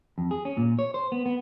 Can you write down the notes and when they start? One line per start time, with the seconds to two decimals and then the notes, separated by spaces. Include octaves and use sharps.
0.18 F2
0.31 G#4
0.45 C#4
0.57 A#2
0.79 C#5
0.94 C5
1.12 B3
1.26 B3